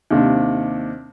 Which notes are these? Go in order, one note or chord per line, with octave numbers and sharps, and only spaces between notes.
D#2 C3 D4